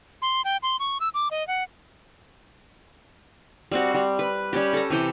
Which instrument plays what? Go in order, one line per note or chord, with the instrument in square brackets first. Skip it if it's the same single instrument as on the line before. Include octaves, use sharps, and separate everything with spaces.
[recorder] C6
G5
C6
C#6
E6
D6
D#5
F#5
[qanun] G3 C4 F#4
G3
B4
G3 C#4 G4
A4 A#5
C3 E3 G5